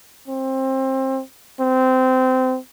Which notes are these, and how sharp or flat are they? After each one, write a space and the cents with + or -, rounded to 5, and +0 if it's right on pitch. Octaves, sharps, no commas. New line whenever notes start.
C4 +25
C4 -20